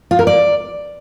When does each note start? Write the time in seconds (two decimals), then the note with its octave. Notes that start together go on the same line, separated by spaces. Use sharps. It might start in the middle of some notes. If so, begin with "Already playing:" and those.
0.11 F4
0.19 A#4
0.27 D5